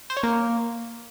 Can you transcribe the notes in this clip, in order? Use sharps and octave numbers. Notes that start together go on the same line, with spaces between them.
C5
C#5
A#3